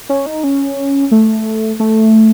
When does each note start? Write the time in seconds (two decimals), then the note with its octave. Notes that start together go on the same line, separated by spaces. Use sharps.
0.09 C#4
0.26 D#4
0.44 C#4
1.11 A3
1.80 A3